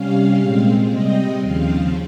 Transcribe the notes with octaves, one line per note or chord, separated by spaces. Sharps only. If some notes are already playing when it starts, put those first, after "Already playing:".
Already playing: C3 G3 C#4 F5
A#2 G#3 C4
C3 G3 C4 D#5
D#2 C#3 F3 C4 F5